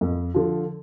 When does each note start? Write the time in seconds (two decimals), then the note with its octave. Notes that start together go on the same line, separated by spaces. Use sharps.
0.01 F2
0.34 D3 F3